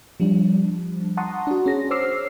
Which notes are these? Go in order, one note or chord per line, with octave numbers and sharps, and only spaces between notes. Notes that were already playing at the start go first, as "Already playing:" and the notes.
F3 G3 D4
F#5 A5 A#5 C6 C#6 D#6
D4 F#4
C#4 G#4 A#6
C5 C#5 D6 E6 F6 C7